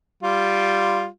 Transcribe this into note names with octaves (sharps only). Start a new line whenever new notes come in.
G3 F4